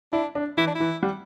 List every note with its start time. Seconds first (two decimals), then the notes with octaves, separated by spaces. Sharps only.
0.13 D4 E4
0.35 D4
0.57 E3 E4
0.67 D4
0.75 E3 E4
1.03 G3